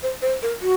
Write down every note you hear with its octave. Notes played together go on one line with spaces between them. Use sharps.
C5
C5
A#4
F#4